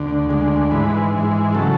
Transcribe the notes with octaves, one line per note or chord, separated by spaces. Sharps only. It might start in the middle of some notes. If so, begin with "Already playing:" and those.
Already playing: D2 D3
D2 D3 G#3
G#2 E3 G#3 B4
G#2 E3 G#3
C#3 F#3 A4